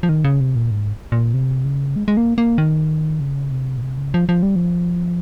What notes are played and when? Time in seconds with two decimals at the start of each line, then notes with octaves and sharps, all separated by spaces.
0.03 F3
0.09 D#3
0.24 C#3
0.40 C3
0.56 A#2
0.71 G#2
1.12 A#2
1.34 C3
1.65 C#3
1.96 G#3
2.08 G#3
2.17 A#3
2.38 A#3
2.58 D#3
3.20 C#3
3.51 C3
3.77 A#2
3.82 C3
3.98 C#3
4.14 F3
4.29 F3
4.43 G3
4.56 F3